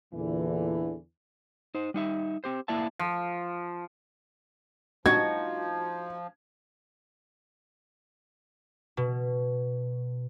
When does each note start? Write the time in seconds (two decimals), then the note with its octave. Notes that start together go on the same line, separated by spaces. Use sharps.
0.14 E2 A#2 D3 E3
1.75 D#4 C5
1.94 G3 D#4 E5
2.44 C4 G4 C5
2.68 A#3 E4 D5 E5 A5
2.99 F3
5.06 F3 D#4 F#4 D#5 G#6
8.97 B2